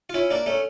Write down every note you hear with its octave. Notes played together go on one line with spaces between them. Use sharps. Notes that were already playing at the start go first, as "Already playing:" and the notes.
F4
C#4 E4
A#3 D4
A3 C#4